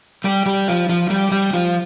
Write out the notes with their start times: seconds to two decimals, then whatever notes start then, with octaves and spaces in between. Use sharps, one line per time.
0.24 G3 G4
0.46 G3 G4
0.68 F3 F4
0.89 F3 F4
1.10 G3 G4
1.31 G3 G4
1.53 F3 F4